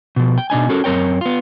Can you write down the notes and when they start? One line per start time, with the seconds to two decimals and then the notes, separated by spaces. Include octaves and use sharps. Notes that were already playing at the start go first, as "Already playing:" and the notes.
0.16 B2 F3
0.38 G5
0.50 B2 D4 D#4 G#5
0.69 C#4 F#4 A4 A#4
0.84 F#2 C4 A#4 C#5 G5
1.21 B3 F4